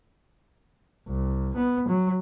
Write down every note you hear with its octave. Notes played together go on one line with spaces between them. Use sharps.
C2
B3
F#3